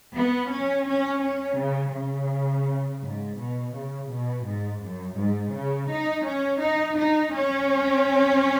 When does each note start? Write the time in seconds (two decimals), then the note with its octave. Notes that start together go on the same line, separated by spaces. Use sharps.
0.15 B3
0.50 C#4
0.86 C#4
1.23 C#4
1.58 C#3
1.94 C#3
3.01 G#2
3.38 B2
3.73 C#3
4.09 B2
4.45 G#2
4.81 F#2
5.16 G#2
5.52 C#3
5.88 D#4
6.24 C#4
6.59 D#4
6.96 D#4
7.31 C#4